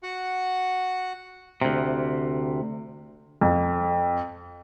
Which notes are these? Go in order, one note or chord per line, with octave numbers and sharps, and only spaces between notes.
F#4 F#5
D2 C3
F2